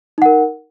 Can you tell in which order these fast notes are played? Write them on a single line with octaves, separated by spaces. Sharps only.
D#4 F#5 A#4